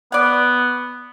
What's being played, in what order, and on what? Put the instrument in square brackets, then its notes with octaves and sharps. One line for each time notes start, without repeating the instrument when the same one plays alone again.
[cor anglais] B3 [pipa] D5 F#5